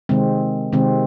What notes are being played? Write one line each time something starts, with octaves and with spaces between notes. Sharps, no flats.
C3 D#3 G#3 C4
C3 D#3 G#3 C4